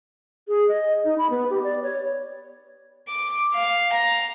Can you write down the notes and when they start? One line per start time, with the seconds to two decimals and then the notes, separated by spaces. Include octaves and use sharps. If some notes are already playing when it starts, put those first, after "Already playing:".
0.48 G#4
0.68 D#5
1.05 D#4
1.18 B5
1.30 B3
1.50 G4
1.64 D5
1.83 C#5
3.08 D6
3.54 F5
3.93 A#5